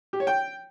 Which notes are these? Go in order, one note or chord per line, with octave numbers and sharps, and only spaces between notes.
G4
C#5
G5